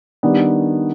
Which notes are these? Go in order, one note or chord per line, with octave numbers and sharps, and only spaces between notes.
D#3 G3 B3 D4